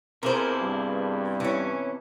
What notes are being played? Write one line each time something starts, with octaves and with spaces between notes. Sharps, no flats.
C3 A#3 B3 E4 G#4 A#4 C5
G2
E3 C#4